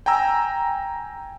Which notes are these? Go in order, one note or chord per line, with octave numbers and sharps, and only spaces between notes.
G5 G#5 A#5 E6